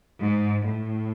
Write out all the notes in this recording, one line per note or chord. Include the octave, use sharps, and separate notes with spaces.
G#2
A2